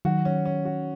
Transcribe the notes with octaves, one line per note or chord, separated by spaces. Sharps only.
D#3 F#3 F#4
C#4
C#4
F#4